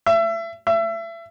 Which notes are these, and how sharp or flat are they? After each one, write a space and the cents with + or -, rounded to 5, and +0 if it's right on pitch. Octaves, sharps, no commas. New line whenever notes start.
E5 +30
E5 +30